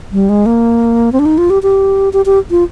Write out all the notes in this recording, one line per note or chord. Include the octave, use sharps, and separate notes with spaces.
G3
G#3
A#3
C4
D4
D#4
F4
G4
G4
G4
G4
F4